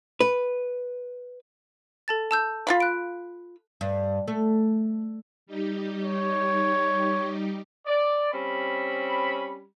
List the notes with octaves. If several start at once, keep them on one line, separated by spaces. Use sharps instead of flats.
B4
A4 A5 A6
A5 E6 G6
F4 F5 B5
F#6 D7
G2
A3
G3 D#4 G4
C#5
D5
G3 C4 C#4 B5